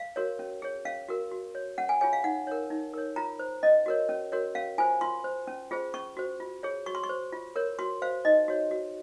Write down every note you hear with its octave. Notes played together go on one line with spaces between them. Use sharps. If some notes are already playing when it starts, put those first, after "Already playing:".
Already playing: F5
F#4 A#4 C#5
C#4
G#4 C#5
C#4 F5
F#4 A#4
F#4
C#5
C#4 F#5
G#5
F4 G#4 C#5 G#5
F5
D#4 F#5
A#4 C#5
D#4
A#4 C#5
F4 A#5
C5
C#4 D#5
F#4 A#4 C#5
C#4
F#4 A#4 C#5
C#4 F5
F4 C5 G#5
F4 C6
C5
C#4
F4 G#4 C5
C#4 C#6
F#4 C5
F4
G#4 C#5
F#4 C#6
C6
C#6
C5
F4
A#4 C#5
F#4 C6
C5 F5
D#4 D#5
F#4 C#5
F#4